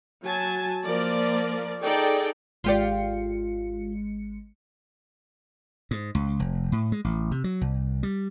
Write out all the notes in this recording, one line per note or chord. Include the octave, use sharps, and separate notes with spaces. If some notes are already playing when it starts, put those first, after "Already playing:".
F#3 G#5 A5
F3 A#3 A#4 D5
D#4 G#4 A4 D5 G5
G#1 G#3 F4 G4 D5 C#7
G#2
C#2
F1
A2
G#3
A1
C3
F#3
C2
G3